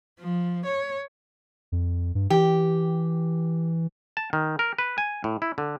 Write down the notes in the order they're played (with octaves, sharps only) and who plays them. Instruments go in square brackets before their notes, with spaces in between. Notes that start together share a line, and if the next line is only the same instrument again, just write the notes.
[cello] F3
C#5
[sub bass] F2
G2
[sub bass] E3 [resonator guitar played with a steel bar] G4
[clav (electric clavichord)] A5
D#3
A#4
B4
G#5
A2
E4
D3